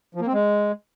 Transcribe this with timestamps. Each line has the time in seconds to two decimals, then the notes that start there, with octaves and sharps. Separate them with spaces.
0.15 F3
0.21 A#3
0.27 C4
0.33 G#3